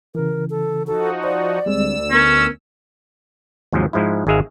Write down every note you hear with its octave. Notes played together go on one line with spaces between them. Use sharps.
C#3 E3 A#4
A4
F3 D#4 F#4 A4
C5 D5
D2 G3 G#3 C4 E6
B3 C#4 A#4
D#2 G#2 C3 F3 F#3
G#2 F3 G#3 E4
G#1 G#2 G#3 G#4 E5 F5